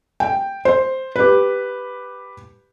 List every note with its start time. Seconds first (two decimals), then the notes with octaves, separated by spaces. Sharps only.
0.20 G5
0.65 C5
1.16 G4 B4